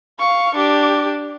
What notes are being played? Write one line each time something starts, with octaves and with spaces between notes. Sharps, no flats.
F5 C#6
D4 G4